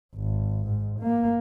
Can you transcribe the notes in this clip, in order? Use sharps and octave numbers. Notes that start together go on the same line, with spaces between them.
G#1
G#2
A#3